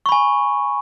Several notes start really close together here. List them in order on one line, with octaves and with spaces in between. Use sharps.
C#6 B5 G#5